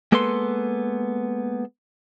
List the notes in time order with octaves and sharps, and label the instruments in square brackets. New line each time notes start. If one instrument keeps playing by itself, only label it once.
[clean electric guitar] G#3 A#3 B3 A4 B4 C6